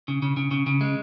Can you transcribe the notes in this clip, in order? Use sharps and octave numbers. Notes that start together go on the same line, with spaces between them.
C#3
C#3
C#3
C#3
C#3
G#3